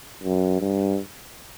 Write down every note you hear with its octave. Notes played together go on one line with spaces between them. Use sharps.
F#2
G2